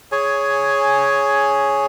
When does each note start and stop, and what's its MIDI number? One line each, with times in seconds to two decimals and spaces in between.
0.12 1.86 68
0.12 1.86 73
0.12 1.86 80